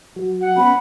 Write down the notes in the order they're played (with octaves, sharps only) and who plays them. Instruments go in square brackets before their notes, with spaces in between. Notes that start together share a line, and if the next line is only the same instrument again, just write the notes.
[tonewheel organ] F#3 F#4
[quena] F#5
[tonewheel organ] B3 C#4 [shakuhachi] B5